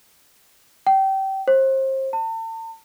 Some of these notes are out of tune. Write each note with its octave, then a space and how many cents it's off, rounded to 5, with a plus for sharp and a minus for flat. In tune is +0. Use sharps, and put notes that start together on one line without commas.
G5 -25
C5 +30
A5 +40